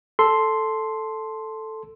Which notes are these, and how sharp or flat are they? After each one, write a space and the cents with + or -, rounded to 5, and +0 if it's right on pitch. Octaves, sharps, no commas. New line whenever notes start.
A4 +0 C6 +0